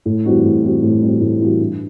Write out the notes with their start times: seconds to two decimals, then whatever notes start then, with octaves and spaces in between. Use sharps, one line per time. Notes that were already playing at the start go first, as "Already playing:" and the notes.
0.06 A2
0.25 E3 G3 C4 F#4
0.44 A2
0.64 E3 G3 C4 F#4
0.83 A2
1.02 E3 G3 C4 F#4
1.21 A2
1.41 E3 G3 C4 F#4
1.60 G2